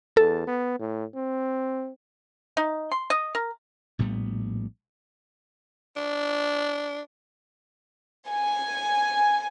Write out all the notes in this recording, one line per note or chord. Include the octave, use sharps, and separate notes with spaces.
E2 A4
B3
A2
C4
D#4
C6
D#5
A#4
A#1 A2 G3 B3
D4
G#5